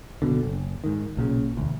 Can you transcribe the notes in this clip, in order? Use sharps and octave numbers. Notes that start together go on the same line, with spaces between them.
F#1 C2 B2 D3
F#1
G#2 D#3
B1 A#2 C#3
E1 D2